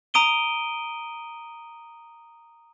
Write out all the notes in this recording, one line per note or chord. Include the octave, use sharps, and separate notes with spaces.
A#5 D#6 D7 D#7 G7